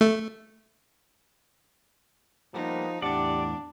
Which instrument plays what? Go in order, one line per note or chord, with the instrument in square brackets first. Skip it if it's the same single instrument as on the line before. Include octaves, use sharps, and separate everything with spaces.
[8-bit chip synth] A3
[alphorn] F3 [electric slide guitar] G3 A#3 B3 [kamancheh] D#4
[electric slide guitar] E2 A2 F#5 [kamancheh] D4 [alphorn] G4 [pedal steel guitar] D5